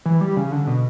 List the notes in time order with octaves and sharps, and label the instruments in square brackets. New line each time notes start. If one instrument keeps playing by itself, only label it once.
[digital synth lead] E3
G3
C#3
D3
B2